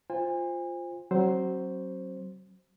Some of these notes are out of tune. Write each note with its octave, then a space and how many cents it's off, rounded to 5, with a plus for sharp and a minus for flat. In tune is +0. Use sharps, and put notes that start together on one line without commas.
F4 +0 C5 +0 G#5 -35
F#3 +20 C4 +35 C5 +0